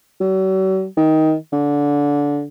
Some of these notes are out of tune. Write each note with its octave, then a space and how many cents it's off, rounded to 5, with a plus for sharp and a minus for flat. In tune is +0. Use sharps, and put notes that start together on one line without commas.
F#3 +45
D#3 +15
D3 -20